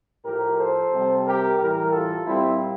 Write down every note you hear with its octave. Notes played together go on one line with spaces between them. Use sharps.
A2 F3 G4 A#4
A4 C5
C3 G3
G4 A#4
A2 E3 G3 G4 A#4
F4 A4
A#2 G3 C4 E4